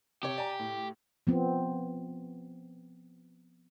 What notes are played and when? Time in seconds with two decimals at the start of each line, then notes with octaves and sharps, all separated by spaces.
0.23 C3 G4 C#5
0.37 D5 G#5 A#5
0.59 A2
1.27 F3 B3 C4